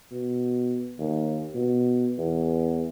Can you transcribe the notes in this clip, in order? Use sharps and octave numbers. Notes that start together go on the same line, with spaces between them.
B2
D#2
B2
E2